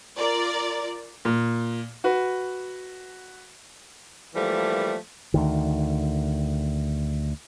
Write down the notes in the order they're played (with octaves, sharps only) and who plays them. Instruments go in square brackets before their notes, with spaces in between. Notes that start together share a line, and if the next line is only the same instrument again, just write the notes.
[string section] F4 A#4 D5
[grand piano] A#2
F#4 B4
[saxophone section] E3 F3 G3 A3 A#3
[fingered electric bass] D2 D#3